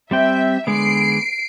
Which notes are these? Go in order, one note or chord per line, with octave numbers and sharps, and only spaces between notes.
G3 C4 E5 G5
D3 G#3 B3 C7 D7